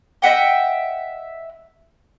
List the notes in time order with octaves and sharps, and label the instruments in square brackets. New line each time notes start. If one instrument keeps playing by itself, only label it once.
[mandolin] D#5 E5 F#5 G5